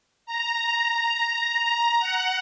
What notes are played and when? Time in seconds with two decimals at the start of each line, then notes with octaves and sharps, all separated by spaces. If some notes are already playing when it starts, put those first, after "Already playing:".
0.26 A#5
0.95 A#5
2.00 F#5